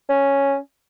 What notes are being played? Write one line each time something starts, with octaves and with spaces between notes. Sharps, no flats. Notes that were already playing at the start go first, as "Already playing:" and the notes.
C#4